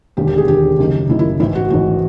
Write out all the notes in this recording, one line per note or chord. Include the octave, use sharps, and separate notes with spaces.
E1 D#2 D3 G4
G4
G#4
E1 D#2 D3 G4
F#1 F#2 D#3
F#1 F#2 D#3 E4
E4
A1 G#2 E3 E4
F#4
A1 G#2 E3 F#4